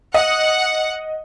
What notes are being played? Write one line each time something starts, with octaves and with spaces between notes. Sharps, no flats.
D#5 F#5